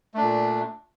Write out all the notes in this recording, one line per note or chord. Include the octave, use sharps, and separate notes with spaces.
A#2 A3 D4